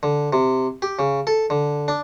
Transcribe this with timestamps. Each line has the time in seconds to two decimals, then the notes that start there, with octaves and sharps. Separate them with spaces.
0.03 D3
0.33 C3
0.82 G4
0.99 C#3
1.27 A4
1.50 D3
1.88 D4